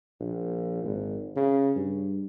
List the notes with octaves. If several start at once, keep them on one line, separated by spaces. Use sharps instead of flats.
A#1
G#1
C#3
G2